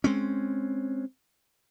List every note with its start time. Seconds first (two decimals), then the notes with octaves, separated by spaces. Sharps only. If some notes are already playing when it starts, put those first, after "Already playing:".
0.04 G#3 C4 C#4